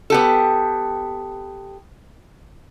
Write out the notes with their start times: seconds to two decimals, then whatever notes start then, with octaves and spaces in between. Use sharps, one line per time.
0.10 B3 G4 A4